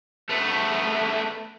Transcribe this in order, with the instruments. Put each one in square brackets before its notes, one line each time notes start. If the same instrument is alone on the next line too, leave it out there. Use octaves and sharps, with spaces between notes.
[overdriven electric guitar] A3 B3